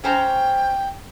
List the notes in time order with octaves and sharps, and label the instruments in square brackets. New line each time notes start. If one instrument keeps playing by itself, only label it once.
[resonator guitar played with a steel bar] C#4 C5 A#5 [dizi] G5